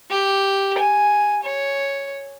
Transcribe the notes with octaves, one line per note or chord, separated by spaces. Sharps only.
G4
G#5
C#5